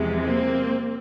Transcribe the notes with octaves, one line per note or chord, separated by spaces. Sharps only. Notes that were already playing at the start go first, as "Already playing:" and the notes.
Already playing: E2 C3 F3 G#3
A#3 C4